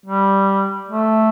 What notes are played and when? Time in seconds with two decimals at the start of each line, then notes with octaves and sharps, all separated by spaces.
0.06 G3
0.89 A3